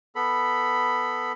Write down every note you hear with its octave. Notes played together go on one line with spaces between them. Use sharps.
B3 A4 B5